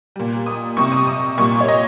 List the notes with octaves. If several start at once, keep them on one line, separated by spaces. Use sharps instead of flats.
A#2 G3
D#6
C3 G3 C#6
D#6
D#6
A#2 G3 C#6
C#5
D#5